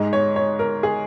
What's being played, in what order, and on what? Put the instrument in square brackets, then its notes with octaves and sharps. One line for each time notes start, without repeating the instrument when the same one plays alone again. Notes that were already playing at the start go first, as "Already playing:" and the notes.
Already playing: [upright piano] G#2 G#3 D#5
C#5
C#5
A#4
G#4